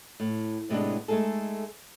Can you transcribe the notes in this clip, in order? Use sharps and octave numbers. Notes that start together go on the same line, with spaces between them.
A2
A2 C3 G#3 B3 D4
G#3 A3 D#4 G#4 A4